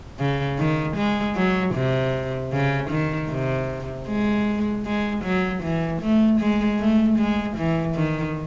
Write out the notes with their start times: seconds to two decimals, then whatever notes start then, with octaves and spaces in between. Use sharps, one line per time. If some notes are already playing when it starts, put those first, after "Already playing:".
0.19 C#3
0.58 D#3
0.96 G#3
1.35 F#3
1.74 C3
2.52 C#3
2.90 D#3
3.29 C3
4.08 G#3
4.85 G#3
5.24 F#3
5.63 E3
6.01 A3
6.40 G#3
6.79 A3
7.18 G#3
7.57 E3
7.96 D#3